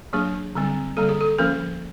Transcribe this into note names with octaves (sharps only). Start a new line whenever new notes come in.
F#3 A#3 D4 G#4
D3 G3 C4
D3 G3 A#3 A4
G#4
A4
F3 A#3 C#4 A#4